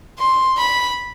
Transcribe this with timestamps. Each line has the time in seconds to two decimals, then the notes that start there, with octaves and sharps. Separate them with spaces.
0.19 C6
0.58 B5